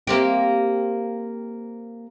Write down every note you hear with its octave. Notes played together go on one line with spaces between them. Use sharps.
A#3 C4 G4